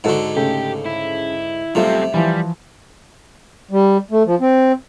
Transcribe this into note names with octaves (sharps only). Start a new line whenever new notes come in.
G#2 D3 F#4 A4 F#5
C#3 A3 G4
E4
F#2 C3 G3 A3 C4 F4
E3 F3 G3
G3
A3
F3
C4